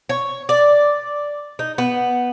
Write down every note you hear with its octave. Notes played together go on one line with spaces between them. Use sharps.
C#5
D5
D#4
B3